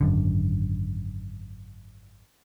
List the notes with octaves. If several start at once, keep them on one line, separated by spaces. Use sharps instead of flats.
G#1 F#2 D3